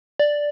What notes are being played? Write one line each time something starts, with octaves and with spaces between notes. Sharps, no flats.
D5